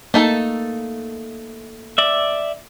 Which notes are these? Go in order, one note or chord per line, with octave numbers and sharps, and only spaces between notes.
A3 A#3 D#4 A4
D5 E5